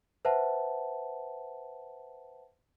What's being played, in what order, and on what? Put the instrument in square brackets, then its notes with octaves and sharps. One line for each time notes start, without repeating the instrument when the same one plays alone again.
[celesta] B4 C5 E5 F#5 A5